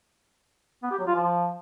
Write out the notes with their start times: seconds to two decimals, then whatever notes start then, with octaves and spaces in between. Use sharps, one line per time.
0.83 B3
0.91 G4
0.99 F#3
1.07 F4
1.15 F3